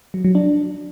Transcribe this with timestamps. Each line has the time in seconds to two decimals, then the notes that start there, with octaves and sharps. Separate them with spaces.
0.14 F#3
0.24 F#3
0.35 D4